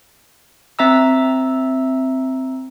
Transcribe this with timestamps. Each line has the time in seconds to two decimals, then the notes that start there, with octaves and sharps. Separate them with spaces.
0.79 C4 E5 A#5 E6